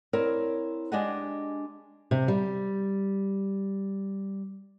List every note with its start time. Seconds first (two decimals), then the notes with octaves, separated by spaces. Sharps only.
0.13 C4 E4 A#4 C#5 D5
0.92 G#3 D4 G4 G#4 D#5 F#5
2.11 C3
2.28 G3